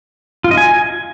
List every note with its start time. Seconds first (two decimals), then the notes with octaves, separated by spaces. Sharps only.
0.44 F4
0.51 D#5
0.57 G#5